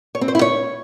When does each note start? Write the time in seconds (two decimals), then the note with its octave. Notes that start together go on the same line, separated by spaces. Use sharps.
0.15 C#5
0.21 C4
0.28 C5
0.35 E4
0.41 C#5